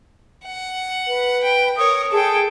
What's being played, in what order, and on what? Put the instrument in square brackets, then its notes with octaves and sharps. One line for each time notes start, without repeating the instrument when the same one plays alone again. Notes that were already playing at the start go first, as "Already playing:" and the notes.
[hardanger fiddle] F#5
[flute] B4
[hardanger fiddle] G5
[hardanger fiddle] A#4 C#5 [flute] D#6
[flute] G#4 [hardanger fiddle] A4 G5